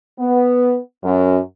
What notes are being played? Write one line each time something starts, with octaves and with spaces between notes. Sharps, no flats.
B3
F#2